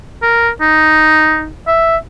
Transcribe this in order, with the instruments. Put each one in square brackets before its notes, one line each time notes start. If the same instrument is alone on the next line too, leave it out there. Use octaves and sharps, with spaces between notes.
[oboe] A#4
D#4
E5